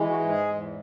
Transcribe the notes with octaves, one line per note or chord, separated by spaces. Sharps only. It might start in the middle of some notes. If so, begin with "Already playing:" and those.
Already playing: E3 G#3
F#4
G#2
G#4
E2